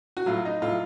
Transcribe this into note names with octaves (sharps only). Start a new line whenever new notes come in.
F#4
A2 F#3 F4
D#4
A2 F#3 F4